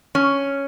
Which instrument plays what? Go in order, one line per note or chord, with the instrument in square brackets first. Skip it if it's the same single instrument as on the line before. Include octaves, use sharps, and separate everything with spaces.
[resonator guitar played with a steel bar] C#4